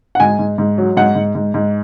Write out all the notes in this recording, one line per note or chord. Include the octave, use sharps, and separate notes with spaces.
F#5
G#2 G#5
G#2
G#2
F#3
G#2 F#5
G#2
G#2
G#2